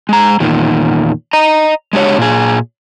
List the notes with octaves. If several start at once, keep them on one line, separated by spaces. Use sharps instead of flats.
G#3 A#5
E2 A#2 D#3
D#5 A#5
G#3 D4 G4 C#5
A#2 G#4